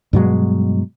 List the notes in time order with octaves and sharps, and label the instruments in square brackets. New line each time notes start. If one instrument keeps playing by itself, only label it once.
[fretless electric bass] G2 B2 F#3 G#3